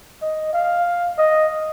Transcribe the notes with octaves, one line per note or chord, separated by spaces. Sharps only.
D#5
F5
D#5